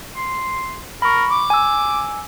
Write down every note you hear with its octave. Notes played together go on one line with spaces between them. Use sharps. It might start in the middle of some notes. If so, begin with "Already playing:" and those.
C6
A#4 B5 C#6
D6
G#5 E6